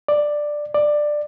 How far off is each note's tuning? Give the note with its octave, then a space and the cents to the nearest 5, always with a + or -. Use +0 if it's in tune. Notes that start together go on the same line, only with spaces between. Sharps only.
D5 +10
D5 +15